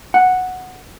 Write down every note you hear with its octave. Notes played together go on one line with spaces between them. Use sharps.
F#5